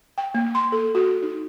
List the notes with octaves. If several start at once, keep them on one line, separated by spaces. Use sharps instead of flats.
G5
A#3
C6
A4
F#4
D#4